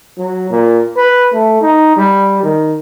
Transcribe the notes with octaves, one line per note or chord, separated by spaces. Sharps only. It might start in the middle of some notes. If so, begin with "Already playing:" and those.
F#3
A#2
B4
A3
D#4
G3
D#3